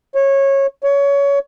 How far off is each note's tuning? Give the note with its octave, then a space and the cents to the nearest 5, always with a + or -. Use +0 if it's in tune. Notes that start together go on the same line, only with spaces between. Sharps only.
C#5 -20
C#5 +20